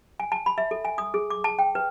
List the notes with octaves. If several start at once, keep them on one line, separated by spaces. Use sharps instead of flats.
G#5
A5
B5
E5
A4
G#5
D#6
G#4
D6
A5
G5
B4